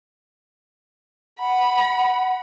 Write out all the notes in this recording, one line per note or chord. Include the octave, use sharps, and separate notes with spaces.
F#5 B5